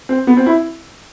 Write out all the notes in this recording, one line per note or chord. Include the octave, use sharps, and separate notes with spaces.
C4
B3
C4
E4